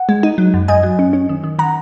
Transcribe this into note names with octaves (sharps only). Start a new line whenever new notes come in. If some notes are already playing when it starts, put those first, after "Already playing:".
Already playing: F#5
G#3
D#4
F#3
F#2
F#2 D#5 G#5
F#3
C#4
C#4
D#3
D#3
D#3 F#5 A#5